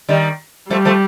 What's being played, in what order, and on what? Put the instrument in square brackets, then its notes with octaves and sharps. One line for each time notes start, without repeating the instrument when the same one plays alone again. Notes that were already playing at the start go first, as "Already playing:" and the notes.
[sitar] D#3 G3
[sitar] F3 A3 [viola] G3
[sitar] F3 A3